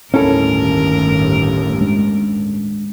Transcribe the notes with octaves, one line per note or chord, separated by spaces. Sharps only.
G1 D#2 A2 C#4 E4 A4 A#4
G#3 D4